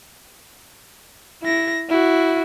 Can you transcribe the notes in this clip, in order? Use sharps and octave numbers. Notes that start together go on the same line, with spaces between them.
E4 A#6
E4 F#4